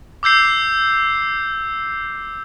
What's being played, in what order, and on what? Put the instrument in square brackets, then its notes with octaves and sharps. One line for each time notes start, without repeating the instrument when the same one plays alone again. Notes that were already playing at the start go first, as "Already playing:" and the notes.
[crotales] D6 E6 G6 C7